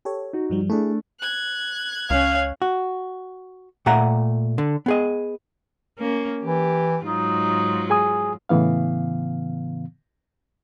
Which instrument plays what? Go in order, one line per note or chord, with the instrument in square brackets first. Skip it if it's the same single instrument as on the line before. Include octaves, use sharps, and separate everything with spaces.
[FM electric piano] G4 A4 C#5
[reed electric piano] D#4 F#4
[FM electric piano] G2 F3 G3
[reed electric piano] A3 D4 [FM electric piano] E4 G#4
[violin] F#6 G#6
[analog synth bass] C#2 [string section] C#4 [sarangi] F5
[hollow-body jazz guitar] F#4
A#2 A3 E5 F#5 A#5
D3
B3 G#4 D#5
[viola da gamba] A#3 C#4
[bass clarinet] E3 [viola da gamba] G4
[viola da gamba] G#2 F#3 F4 [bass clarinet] D#4
[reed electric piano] G#4 G#5 D#6
A2 C#3 E3 B3 F5